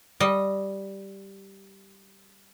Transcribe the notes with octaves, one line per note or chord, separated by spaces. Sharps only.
G3 D#5